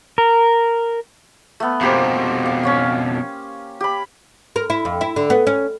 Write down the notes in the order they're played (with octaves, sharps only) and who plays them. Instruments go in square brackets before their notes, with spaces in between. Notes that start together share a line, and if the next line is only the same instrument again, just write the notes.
[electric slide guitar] A#4
[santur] A3 B3
[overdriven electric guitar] F2 B2 [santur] A#3 G4 C5
[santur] F5
C#4 C#5 F5
G4 B5
[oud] A#4
E4
F2
E4
D3
B3
C#4